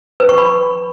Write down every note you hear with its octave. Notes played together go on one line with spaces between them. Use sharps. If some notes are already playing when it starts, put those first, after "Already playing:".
B4
C#6
B5